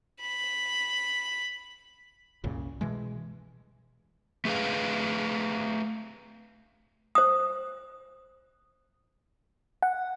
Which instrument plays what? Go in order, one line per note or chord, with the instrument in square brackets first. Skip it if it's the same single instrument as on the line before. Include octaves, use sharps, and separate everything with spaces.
[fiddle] B5
[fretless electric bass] C2 F#2 A#2 C#3
B2 E3 G#3
[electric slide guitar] A3 G#4 A4 B4 F5
[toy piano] C5 D#6
[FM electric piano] F#5